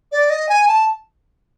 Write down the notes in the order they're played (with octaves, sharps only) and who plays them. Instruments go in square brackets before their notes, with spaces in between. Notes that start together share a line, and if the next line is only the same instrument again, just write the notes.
[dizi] D5
D#5
G#5
A5